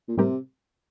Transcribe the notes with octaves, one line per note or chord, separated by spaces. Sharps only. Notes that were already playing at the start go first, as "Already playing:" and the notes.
A#2
A2 C3 G3 C4 G4 A#4